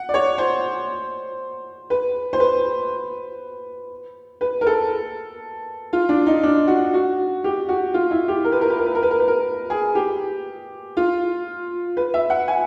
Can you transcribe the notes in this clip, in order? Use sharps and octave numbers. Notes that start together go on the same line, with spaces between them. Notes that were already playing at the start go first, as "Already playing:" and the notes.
Already playing: F#5
D5
C#5
C5
B4
C5
B4
B4
A#4
A4
F4
D4
D#4
D4
F#4
F#4
G4
F#4
F4
E4
G4
A#4
B4
A#4
B4
A#4
B4
A#4
B4
A#4
B4
A#4
G#4
G4
F4
B4
E5
F#5
G#5